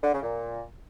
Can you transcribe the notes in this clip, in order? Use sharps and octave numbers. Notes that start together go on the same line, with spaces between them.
D3
C#3
A#2